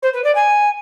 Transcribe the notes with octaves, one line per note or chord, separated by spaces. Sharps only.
C5
B4
D5
G#5